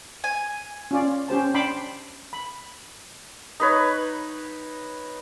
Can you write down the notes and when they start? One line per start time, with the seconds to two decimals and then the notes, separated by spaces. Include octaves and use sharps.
0.24 G#5
0.91 C#4 F4 D5
1.28 C#4 G4 C5 A5
1.54 D4 G5 A5 B5 C6 D6
2.33 B5
3.60 D#4 B4 C#5